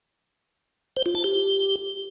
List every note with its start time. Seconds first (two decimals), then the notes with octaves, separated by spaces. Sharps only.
0.97 C5
1.06 F4
1.15 A5
1.24 G4